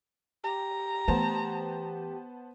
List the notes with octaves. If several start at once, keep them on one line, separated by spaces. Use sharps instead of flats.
G4 A#5
E3 A3 B3 C5 A5